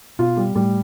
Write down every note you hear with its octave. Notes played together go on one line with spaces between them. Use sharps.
B2 F4
G3
A2 G3